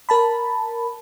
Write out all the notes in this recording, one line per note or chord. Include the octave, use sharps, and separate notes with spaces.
A#4 A5 B5